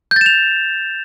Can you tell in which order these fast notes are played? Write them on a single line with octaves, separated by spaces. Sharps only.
G6 A6 E7 F7